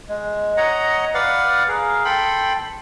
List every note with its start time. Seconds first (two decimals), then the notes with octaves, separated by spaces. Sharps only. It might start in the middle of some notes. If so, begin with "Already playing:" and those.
0.08 G#3
0.57 C#5 D#5 F#5 A#5
1.14 B4 D5 F5 F#5
1.68 G#4 A#4 F5
2.05 A4 G5 B5 C6